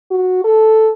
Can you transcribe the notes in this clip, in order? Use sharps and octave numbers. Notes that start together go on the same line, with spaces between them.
F#4
A4